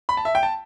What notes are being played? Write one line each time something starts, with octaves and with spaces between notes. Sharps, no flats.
B5
A5
E5
G5
A5